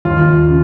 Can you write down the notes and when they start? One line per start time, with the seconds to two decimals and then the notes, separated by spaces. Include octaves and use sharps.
0.05 D#2 F4
0.48 C#3